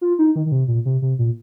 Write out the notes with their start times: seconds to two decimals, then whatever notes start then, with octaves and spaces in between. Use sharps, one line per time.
0.01 F4
0.19 D#4
0.36 D#3
0.46 D#3
0.52 C3
0.68 A#2
0.85 C3
1.02 C3
1.19 A#2